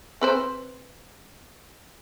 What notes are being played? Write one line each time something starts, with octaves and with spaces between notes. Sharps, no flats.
C4 B4 C5